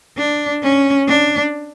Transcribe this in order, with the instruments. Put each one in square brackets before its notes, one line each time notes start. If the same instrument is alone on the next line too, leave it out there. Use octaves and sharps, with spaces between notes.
[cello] D4
C#4
D4